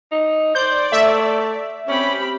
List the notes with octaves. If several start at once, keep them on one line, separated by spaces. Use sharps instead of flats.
D#4
C5 D5 G6
A3 E5
C4 C#4 G4 B5